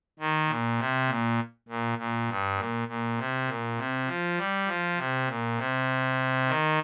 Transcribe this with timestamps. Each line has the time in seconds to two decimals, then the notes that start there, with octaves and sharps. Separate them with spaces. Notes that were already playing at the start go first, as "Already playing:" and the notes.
0.19 D#3
0.49 A#2
0.79 C3
1.08 A#2
1.69 A#2
1.98 A#2
2.28 G2
2.58 A#2
2.88 A#2
3.18 C3
3.48 A#2
3.77 C3
4.07 F3
4.37 G3
4.67 F3
4.97 C3
5.27 A#2
5.57 C3
6.47 D#3